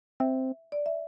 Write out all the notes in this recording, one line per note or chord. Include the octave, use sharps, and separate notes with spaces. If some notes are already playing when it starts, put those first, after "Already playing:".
C4 E5
D5
E5